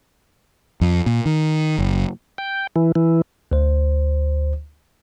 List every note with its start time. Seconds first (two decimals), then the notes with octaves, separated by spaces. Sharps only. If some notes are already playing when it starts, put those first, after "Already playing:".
0.81 F2
1.06 A#2
1.26 D#3
1.79 F#1
2.38 G5
2.76 E3
2.95 E3
3.52 D2 C5